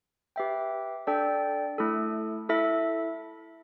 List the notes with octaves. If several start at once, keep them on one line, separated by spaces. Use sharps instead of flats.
G4 B4 E5 G5
D4 A4 D5 G5
A3 E4 A4
E4 A4 E5